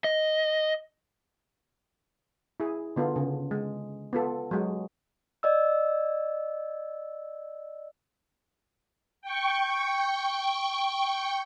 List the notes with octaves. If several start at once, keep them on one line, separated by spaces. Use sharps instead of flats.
D#5
E4 G#4
D3 B3 F4 A4
C#3
G#3
B3 F4 A4
F#3 G#3
D5 D#5 E6
G5 C#6